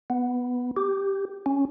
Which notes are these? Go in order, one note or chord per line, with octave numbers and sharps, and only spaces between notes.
B3
G4
C#4